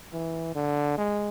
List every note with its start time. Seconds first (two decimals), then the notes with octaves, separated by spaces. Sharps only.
0.13 E3
0.55 D3
0.98 G#3